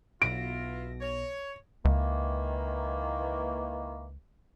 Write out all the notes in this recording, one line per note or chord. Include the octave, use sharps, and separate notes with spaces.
B1 B2 E4 F4 A#6 D7
C#5
C#2 D#3 E3 A#3